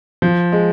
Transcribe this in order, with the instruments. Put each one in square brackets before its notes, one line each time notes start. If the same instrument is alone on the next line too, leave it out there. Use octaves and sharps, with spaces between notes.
[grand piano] F3
G#3